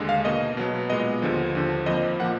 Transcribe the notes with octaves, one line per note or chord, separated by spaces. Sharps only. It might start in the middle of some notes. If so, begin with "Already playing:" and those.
Already playing: D#2 D3 G#3
F5
B2 A#3 D#5
B2 F#3 B3
A#2 G#3 B3 D#5
D#2 D3 F3
D#2 D3 F3
F2 F3 A#3 D#5
A#2 F3 A#3 F#5